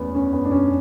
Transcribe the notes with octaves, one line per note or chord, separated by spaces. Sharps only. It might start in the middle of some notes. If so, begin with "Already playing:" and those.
Already playing: E2 B3 C#4
C#4
B3
D4
C#4